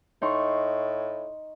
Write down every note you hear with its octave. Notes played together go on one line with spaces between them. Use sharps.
A2 D#4 C6 C#6